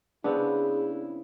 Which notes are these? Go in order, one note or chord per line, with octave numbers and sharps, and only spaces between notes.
C#3 B3 C4 D4 E4 G#4